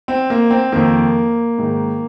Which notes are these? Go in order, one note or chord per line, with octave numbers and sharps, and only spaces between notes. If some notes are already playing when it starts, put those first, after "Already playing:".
C4
A#3
C4
F2 D#3 A#3
G#2 D#3